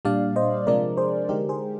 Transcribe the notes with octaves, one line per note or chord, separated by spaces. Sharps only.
A#2 G3 D4 D5 F5
C5 D#5
C3 F3 G#3 D4 A#4 D5
G#4 C5
D3 G#3 D#4 G4 A#4
G#4 C5